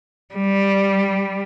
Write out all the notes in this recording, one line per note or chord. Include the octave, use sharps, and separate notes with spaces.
G3